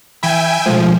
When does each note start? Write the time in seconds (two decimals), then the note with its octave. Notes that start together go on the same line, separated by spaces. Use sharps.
0.23 E3 E5 G5 G#5 B5
0.66 B2 F3 G#3 A3